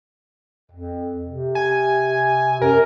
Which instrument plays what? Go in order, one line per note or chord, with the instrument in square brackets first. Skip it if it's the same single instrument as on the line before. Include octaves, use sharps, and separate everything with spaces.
[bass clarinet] F2
C3
[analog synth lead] G#5
[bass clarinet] F#2 [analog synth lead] A#4